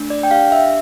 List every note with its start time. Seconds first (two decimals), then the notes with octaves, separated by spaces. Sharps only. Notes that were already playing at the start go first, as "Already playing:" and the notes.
Already playing: A3 D4
0.10 D5
0.23 G5
0.31 G4 F5
0.52 E5